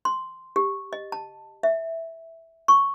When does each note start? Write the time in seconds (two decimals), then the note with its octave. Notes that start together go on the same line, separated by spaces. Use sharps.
0.05 C6
0.56 G4
0.93 D#5
1.12 A5
1.63 E5
2.68 C#6